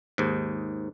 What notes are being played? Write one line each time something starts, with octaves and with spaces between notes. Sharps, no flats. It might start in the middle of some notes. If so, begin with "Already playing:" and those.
D#2 G#2